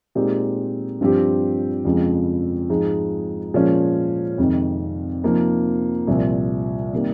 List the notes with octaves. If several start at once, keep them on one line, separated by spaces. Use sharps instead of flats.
A#2 G#3 C4 D#4 G4
G2 F3 C4 G4
F2 C#3 F3 G#3
G#2 F3 G#3 D#4 G#4
A#2 F3 G#3 C#4
F2 C3 D#3 G#3
C3 F3 A#3 D#4
C2 A#2 F3 C4
C3 D#3 G3 A#3